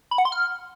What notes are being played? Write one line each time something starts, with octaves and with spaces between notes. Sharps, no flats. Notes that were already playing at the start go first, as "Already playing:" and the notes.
B5
F#5
C6
F6